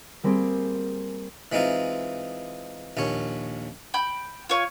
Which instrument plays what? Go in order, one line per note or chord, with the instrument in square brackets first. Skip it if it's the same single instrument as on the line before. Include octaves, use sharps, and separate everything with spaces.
[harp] G3 A#3 C4 G#4
[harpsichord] E3 G#3 C4 D#4 F4
A#1 D#2 C#4 C#5
[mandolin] G5 B5 G6
F4 C#5 C#6